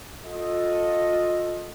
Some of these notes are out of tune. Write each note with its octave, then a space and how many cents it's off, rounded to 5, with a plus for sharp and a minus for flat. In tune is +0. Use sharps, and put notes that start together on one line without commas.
F4 +30 A4 +0 D#5 +0